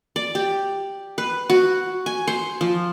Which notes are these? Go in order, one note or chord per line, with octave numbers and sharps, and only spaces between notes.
D5
G4
B4
F#4
G#5
C5
F3